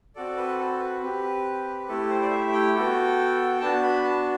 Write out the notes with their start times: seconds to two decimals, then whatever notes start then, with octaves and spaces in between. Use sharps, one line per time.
0.15 C4 F#4 A4 D5
0.37 B4
0.58 A4
0.80 B4
1.02 C4 G4
1.88 A3 E4 G4 A4
2.10 C5
2.22 D5
2.31 E5
2.53 G5
2.74 B3 F#4 A4
3.61 B3 D4 F#4 A5
3.83 B5
4.04 A5